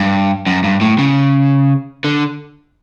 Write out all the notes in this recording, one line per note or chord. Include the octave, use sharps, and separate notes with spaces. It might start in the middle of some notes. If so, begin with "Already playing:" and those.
Already playing: G2
F#2
G2
A2
C#3
D3